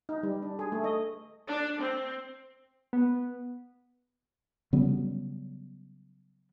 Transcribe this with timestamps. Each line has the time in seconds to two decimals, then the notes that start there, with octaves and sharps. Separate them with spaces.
0.09 D#4
0.23 G3
0.42 D4
0.59 G#4
0.72 A3
0.84 D#5
1.48 D4
1.79 C4
2.93 B3
4.73 C#3 F#3 G3 B3